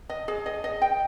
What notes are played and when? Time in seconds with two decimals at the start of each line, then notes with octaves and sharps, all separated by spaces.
0.10 D#5
0.28 G#4
0.46 D#5
0.64 D#5
0.82 G5